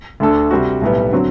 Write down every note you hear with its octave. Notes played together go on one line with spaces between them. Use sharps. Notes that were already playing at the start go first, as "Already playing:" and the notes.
D2 D3 A3 D4 A4
C3 G3 C4 F#4
B1 A2 G3 B3
D3 F#3 C4 F#4